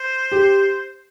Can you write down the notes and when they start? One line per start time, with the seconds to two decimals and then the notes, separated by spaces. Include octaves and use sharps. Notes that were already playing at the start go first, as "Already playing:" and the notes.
Already playing: C5
0.32 G4